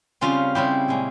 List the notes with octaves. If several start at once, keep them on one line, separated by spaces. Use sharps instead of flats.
C#3 G3 C4 C#4 F4
C#3 G3 C4 E4 G4
A#2 G#3 C#4